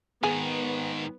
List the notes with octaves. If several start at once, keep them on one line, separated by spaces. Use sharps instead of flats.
G#2 D#3 B3 G#4